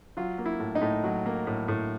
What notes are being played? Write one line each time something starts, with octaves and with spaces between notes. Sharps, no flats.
F#3 F4
A#3
E4
A2
D#4
A2
F#3
A#3
A2
A2